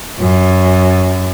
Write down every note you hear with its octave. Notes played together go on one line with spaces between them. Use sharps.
F#2